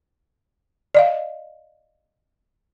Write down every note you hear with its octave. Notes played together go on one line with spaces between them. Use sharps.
D5 D#5 F5